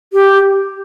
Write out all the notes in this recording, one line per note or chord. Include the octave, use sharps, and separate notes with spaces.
G4